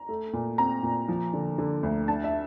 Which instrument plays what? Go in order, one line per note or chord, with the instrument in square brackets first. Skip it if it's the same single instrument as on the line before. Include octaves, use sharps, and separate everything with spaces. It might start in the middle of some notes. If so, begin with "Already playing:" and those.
Already playing: [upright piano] A#5
A3
A#2
C4 A#5
A#2
F3
D3
D3
D2
D4 A5
E5